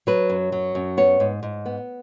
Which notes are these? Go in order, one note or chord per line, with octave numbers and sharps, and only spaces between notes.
F#3 B4
F#2
F#3
F#2
B3 C#5
G#2
G#2
B3